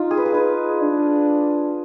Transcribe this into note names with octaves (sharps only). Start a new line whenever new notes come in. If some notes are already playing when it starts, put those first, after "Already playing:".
Already playing: D#4 F4
G#4
B4
G#4
D#4 B4
D4